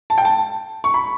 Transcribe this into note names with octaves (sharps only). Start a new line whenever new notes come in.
A5
G5
A5
C#6
B5